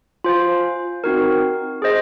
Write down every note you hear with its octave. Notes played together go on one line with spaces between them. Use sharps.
F4 C5 F5 G#5
C4 D#4 F#4 A#4
G#4 C5 D#5